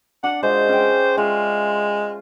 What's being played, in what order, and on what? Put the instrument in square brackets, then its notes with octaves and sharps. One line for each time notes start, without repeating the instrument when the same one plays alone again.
[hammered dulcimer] D4 [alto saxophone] F#5
[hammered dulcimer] G#3 F4 F#4 [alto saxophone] C5
[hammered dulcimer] C#4 G5
[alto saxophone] G#3 [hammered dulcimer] F4 C5 E5